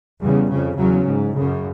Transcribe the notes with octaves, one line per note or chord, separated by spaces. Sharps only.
E2 C#3 G3
F2 C#3
E2 C#3 F#3
G#2
F#2 C#3